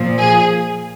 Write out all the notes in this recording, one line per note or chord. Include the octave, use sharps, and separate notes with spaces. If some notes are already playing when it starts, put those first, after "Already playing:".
Already playing: A#2 F3
G#4